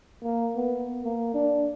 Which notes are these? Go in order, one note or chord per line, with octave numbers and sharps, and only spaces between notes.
A#3
B3
A#3
D4